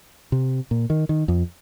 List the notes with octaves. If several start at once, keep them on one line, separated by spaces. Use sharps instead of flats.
C3
A#2
D#3
D#3
F2